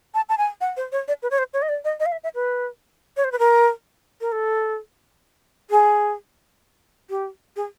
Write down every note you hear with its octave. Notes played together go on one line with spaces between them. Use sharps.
A5
A5
G#5
F#5
C5
C#5
D5
B4
C#5
C5
C#5
D#5
D5
D#5
D#5
F5
E5
E5
B4
C#5
C5
B4
A#4
A#4
A4
G#4
G4
G#4